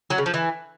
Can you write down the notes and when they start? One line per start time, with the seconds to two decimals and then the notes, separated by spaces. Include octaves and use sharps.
0.10 F#3
0.18 C#3
0.26 F3
0.34 E3